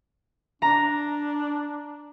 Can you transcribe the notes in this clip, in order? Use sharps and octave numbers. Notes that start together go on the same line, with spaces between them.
D4 A#5